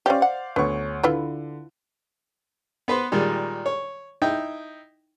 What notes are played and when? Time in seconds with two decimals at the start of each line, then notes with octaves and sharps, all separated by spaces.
0.06 C#4 G4 C5 D5 F5
0.22 F#5
0.56 D2 B3 C#4 C#6
1.03 D3 E4 F4 B4
2.88 B3 B4 C5
3.12 A#2 D#3 G3 G#3
3.66 C#5
4.22 D#4 E4 G5